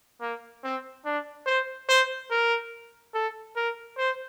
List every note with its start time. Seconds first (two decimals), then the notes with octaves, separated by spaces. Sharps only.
0.21 A#3
0.64 C4
1.06 D4
1.47 C5
1.89 C5
2.31 A#4
3.14 A4
3.56 A#4
3.98 C5